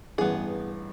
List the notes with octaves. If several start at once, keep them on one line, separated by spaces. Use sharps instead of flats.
A1 G2 B3 G#4